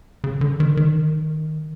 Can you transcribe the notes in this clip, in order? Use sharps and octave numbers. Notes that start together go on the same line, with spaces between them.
C#3
D3
D#3
D#3